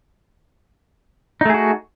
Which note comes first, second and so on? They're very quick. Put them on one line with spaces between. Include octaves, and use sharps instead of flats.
D#4 A3 G#4 F#4